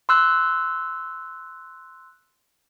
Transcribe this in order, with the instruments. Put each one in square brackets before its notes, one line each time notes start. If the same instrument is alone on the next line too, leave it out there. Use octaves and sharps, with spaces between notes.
[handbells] C6 E6 F#6